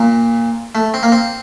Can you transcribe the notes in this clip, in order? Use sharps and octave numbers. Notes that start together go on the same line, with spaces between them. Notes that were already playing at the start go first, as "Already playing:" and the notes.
Already playing: A#2
A3
C4
A#3
C4